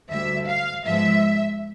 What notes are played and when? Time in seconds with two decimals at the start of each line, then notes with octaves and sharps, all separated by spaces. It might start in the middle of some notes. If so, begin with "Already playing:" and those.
0.10 D2 D3 G3 E5
0.48 F5
0.85 G#2 F3 G#3 B3 E5